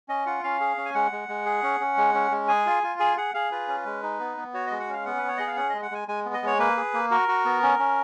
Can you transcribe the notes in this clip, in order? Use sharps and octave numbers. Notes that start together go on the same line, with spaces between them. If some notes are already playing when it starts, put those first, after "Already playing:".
C#4 D#5
F4 F#5
C#4 F5
G#4
C#4
G#5
G#3 F#5
G#3
G#3
G#4
C#4
C#4
G#3
C#4
G#3
G#4 G#5
F4
F4
G#4 G#5
G#4 F#5
G#4 F5
F4 B4
C#4
G#3
D#4
B3
B3
F#4 C#5
G#3 D#5
F#5
C#4 F5
B3 F#5
B3 B4
C#5
G#4 D#5
F5
C#4 F#5
G#3 D#5
F#5
G#3 G#5
G#3 G#5
B3
D#5
G#3 C#5
A#3 B4
G#4
A#3
F#4 A#4
F#4
B3
C#4
C#4